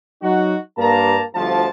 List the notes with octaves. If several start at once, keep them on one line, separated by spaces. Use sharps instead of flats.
F#3 D#4 F#4
G2 A#3 A5 A#5
G1 D2 F3 A5